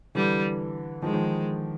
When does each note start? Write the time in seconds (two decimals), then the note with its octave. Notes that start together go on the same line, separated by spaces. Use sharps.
0.15 D3 E3 G3
1.02 D#3 F3 G#3
1.14 D#3 F3